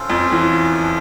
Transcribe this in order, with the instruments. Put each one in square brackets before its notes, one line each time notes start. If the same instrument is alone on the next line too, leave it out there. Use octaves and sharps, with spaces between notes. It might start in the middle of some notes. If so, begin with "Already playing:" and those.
Already playing: [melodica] C#4 F4 A4 C5
[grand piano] F2 F3
E2 E3